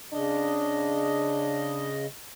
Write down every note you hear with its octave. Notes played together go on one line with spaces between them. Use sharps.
C#3 D4 D#5